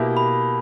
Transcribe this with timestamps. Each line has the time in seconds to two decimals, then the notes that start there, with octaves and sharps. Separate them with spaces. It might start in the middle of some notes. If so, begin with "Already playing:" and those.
Already playing: B2 A#3 E4 G4
0.17 B5